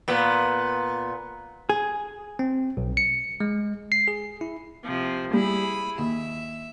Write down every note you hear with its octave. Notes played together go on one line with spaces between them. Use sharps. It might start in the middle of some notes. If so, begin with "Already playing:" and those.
A#2 B3
G#4
C4
B1
C#7
G#3
C7
G#4
E4
C3 F3
G3 E4 G#4 B5
D#2 E5